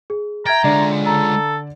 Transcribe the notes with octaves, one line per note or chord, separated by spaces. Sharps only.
G#4
E5 G5 A#5 G#6 A6
D3 G#3 F4 D5
A4 A#5